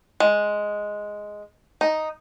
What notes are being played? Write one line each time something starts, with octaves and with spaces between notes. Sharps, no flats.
G#3
D#4